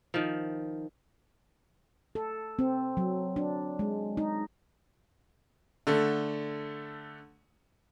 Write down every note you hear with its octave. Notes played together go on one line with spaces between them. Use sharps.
D#3 F3
A4
C4
F#3
D4
G#3
D#4
D3 A3